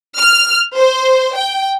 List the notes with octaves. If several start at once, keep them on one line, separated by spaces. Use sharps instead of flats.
F6
C5
G5